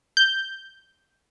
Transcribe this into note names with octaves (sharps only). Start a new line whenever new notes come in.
G6